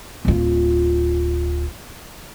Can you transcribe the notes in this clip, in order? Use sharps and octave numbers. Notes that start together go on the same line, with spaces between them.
D1 F4